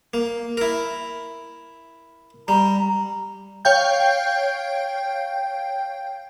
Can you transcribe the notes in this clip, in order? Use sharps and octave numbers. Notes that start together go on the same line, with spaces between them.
A#3
E4 A#4
G3 A#5
C#5 F5 G5 G6